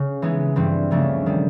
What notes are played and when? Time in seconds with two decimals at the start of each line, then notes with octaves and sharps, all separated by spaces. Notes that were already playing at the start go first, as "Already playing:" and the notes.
Already playing: C#3
0.22 E3 G#3 B3 D#4
0.56 G2 E3 G3 C4
0.91 D2 C#3 F3 A3 D4
1.26 D#3 G3